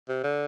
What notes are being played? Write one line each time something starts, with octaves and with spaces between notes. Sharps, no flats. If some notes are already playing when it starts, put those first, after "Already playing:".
C3
D3